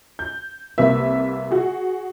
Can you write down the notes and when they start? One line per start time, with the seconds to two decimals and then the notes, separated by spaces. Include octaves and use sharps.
0.19 G6
0.78 C2 C3 A#3 B4 E5
1.51 F#4 G#4